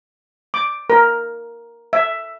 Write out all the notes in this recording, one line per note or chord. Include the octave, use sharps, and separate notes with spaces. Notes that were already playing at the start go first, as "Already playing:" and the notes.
D6
A#4
E5